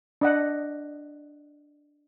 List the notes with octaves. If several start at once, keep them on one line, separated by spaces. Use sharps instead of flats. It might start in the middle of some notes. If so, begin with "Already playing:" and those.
D4 D#5 F#5